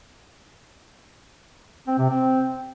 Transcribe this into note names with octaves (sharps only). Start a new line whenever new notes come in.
C4
C3
C4